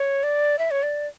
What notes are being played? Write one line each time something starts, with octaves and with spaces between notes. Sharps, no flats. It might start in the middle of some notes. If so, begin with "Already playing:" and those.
Already playing: C#5
D5
E5
C#5
D5